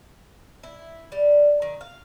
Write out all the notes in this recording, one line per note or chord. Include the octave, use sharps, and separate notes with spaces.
E4
G3
D#3
F5